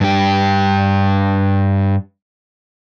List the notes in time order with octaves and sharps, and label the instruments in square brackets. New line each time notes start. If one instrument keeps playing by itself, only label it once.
[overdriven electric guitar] G2 G4